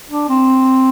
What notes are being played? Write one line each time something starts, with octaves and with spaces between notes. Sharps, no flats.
D4
C4